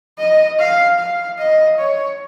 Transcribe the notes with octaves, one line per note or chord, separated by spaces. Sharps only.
D#5
F5
F5
D#5
C#5